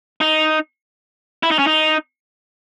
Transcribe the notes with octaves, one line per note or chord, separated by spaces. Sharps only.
D#4
E4
D#4
C#4
D#4